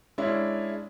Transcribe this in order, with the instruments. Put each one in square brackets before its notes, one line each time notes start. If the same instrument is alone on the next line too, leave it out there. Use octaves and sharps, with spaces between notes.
[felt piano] G#3 C#4 D4 E4